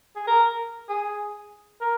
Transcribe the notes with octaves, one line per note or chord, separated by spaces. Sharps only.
G#4
A#4
G#4
A#4